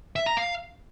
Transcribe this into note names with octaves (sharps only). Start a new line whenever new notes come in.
E5
A#5
F5